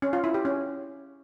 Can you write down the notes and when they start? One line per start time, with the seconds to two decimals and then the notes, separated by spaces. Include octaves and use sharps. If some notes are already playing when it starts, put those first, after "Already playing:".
0.02 C#4
0.13 F4
0.24 E4
0.34 G4
0.45 C#4